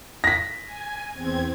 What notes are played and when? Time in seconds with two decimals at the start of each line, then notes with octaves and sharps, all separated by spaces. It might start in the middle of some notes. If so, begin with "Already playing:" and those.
0.24 A#6 B6
0.65 G#5
1.14 E2 C4 G#6